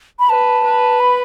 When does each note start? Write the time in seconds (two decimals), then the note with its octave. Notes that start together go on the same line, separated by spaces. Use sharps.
0.19 B5
0.29 B4 A5
0.65 B4
1.00 B5